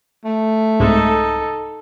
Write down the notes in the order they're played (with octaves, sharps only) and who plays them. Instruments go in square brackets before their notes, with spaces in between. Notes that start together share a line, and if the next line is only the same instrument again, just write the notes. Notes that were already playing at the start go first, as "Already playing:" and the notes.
[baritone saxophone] A3
[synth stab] C2 G#2 G#3 [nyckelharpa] D#4 A4